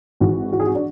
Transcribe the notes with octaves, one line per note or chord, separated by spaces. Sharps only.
G#1 G#2 E3 F#4
F#4
G#4
F#4
D4